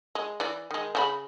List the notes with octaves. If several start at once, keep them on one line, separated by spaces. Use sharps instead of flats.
G#3
E3 D5
D#3 G#3
C#3 F4 B5